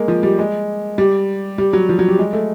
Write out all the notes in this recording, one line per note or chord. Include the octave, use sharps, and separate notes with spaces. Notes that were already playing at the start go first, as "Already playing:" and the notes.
Already playing: G#3 A#3
F3
G3
G#3
G3
G3
F#3
F3
F#3
G3
G#3
A3